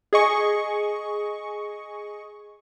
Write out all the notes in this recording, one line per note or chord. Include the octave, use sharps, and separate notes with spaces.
G#4 D#5 C#6